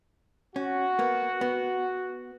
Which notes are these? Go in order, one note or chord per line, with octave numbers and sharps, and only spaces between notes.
C#4 F#4
A#3 B3
B3